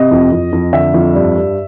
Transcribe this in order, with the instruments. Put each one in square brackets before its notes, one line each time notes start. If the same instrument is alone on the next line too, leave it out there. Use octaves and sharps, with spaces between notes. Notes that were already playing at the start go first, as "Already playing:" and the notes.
Already playing: [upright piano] C3 D#5
F2
F2
F2
D3 E5
F2
G2
G2